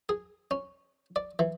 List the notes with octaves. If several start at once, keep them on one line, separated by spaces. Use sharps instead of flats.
G#4
C#4
D5
E3